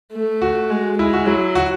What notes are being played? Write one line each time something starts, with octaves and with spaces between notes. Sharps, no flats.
A3
F#4
G#3
G#3 E4
F#4
F#3 E4
F#4